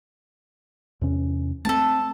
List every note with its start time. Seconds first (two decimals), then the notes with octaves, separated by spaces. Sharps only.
1.01 E2 C3 C#4
1.65 A3 B3 C4 A4 A5